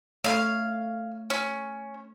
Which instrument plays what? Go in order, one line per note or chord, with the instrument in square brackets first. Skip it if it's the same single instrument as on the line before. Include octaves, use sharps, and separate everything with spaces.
[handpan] A3 C#5 [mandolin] F5 F6
[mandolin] C#4